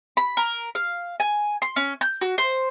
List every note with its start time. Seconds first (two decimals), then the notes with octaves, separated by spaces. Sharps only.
0.17 B5
0.37 A#4
0.75 F5
1.20 G#5
1.62 C6
1.76 C#4
2.01 G6
2.21 F#4
2.38 C5